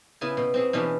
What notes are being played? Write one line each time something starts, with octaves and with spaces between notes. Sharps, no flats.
C#3 B3 E4 G#5
B2
C4 F#4 G#4
B2 E3 C#4 D4 G4